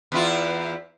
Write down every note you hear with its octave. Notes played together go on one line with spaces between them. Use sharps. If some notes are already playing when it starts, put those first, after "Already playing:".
E2 E4 F4